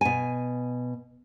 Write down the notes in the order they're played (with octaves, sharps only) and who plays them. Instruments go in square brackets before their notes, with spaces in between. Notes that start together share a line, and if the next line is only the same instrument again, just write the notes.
[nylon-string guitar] B2 G#5